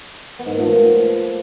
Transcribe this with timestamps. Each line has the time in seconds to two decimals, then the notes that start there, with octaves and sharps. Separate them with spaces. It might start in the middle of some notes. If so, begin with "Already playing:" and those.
0.39 B3
0.46 G#2
0.53 A#2
0.60 A3
0.67 F3